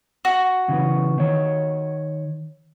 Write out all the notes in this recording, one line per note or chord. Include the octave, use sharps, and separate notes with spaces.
F#4
C#3 E3 B3
D#3 C#5